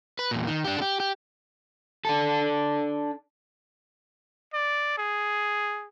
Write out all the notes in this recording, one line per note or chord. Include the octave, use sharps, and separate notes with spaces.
B4
E2 A#2
D#3
D4 G4
G4 A4
G4
D4 A4
D5
G#4